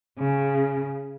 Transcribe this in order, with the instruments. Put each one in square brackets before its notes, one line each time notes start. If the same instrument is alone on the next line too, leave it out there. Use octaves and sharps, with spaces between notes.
[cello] C#3